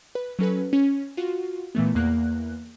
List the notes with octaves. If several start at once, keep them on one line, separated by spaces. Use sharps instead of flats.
B4
F#3 C#4 A4 B4
C#4
F4 F#4
A#2 E3 A3 B3
E2 A#3 F#6